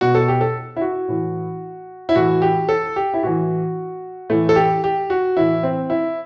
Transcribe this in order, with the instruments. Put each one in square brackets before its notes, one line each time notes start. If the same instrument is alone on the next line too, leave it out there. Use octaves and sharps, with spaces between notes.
[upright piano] B2 F#4
A4
G4
A4
E4
F#4
A2 E3
E4
A2 E3 F#4
G4
A4
G4
E4
A2 E3 F#4
A2 E3 A3
A4
G4
G4
F#4
A2 E3 E4
C4
E4